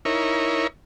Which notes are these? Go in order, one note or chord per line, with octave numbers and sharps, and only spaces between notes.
D#4 E4 A#4 C#5